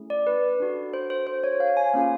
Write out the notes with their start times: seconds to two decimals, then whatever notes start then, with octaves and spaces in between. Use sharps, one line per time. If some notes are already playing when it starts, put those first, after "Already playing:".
Already playing: A3 C#4 E4 G#4
0.10 D5
0.27 B4
0.60 D4 F#4 A4
0.94 C5
1.10 C5
1.27 C5
1.44 C#5
1.60 F5
1.77 G#5
1.94 A#3 C#4 F4 G#4 F5